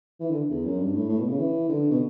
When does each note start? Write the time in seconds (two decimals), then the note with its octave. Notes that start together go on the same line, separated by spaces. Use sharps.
0.20 E3
0.30 D3
0.50 E2
0.65 F#2
0.79 G2
0.95 A2
1.09 A2
1.19 B2
1.29 C#3
1.39 E3
1.69 D3
1.91 B2